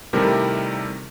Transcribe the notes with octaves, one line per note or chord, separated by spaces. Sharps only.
C3 D#3 G3 A3 E4 A#4